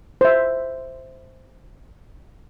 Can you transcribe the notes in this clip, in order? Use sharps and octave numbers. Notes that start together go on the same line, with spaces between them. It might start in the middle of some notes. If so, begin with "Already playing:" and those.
C5 E5